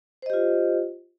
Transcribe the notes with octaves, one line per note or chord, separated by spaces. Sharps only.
F4 G4 C5 D#5